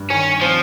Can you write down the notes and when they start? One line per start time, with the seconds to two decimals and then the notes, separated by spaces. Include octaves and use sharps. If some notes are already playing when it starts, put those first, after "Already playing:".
Already playing: G2
0.10 D#3 C#4
0.41 F3 C4